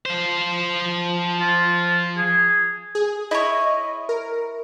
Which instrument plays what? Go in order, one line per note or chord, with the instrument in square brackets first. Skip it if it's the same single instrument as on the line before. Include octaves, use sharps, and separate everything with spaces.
[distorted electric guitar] F3 C5
[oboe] F4
G#4
[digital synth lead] G#4
[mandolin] E4 C#5 [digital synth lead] D#5
[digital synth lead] A#4